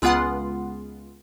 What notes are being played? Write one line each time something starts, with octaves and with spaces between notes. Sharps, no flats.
C#2 G#3 B3 F4 F#5 C6